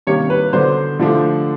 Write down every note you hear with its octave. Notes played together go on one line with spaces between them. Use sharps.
C3 D#3 G3 A#3 C#4 C#5
B4
D3 F#3 B3 D4 C5
D3 F3 A3 D4